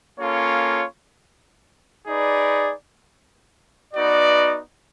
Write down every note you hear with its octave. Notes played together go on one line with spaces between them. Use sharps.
A#3 C#4 F4 A4 C#5
D#4 G#4 B4 D5
B3 D#4 F#4 B4 D5